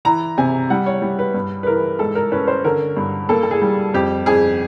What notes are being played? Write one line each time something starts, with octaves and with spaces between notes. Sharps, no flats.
E3 A#5
C3 G#5
G3 F#5
C#5
G3
B4
G2
B4
E3 A#4
G#2 A4
A#4
C#4 B4
C5
D3 A#4
G2
A#3 A4
A4
G#4
G3
F2 G4
F2 G#4